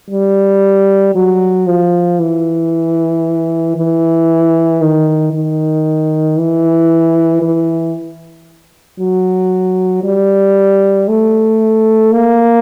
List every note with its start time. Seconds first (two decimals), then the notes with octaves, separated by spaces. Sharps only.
0.11 G3
1.15 F#3
1.67 F3
2.19 E3
3.76 E3
4.81 D#3
5.33 D#3
6.37 E3
7.42 E3
8.99 F#3
10.03 G3
11.08 A3
12.12 A#3